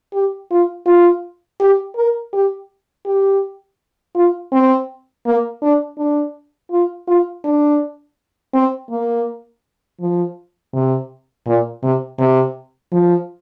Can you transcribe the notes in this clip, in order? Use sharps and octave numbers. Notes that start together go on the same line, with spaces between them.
G4
F4
F4
G4
A#4
G4
G4
F4
C4
A#3
D4
D4
F4
F4
D4
C4
A#3
F3
C3
A#2
C3
C3
F3